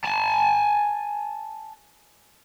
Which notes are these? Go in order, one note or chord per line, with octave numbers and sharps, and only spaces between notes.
G#5 A5